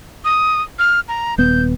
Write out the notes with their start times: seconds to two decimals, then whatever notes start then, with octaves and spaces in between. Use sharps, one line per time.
0.25 D#6
0.79 F6
1.08 A#5
1.38 D#1 B3 G6